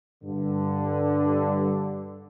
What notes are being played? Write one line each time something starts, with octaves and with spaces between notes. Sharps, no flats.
G2 D3